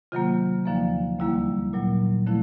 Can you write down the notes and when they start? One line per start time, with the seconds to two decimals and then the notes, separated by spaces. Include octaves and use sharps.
0.12 C3 D#3 F#3 A#3 F4
0.65 D#2 D3 F3 A#3
1.19 D2 D3 G3 A#3 E4
1.73 A#2 F#3 A#3
2.26 D3 F3 A3 C4 E4